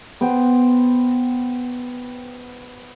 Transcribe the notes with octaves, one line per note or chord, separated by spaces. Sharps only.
B3 C5 G5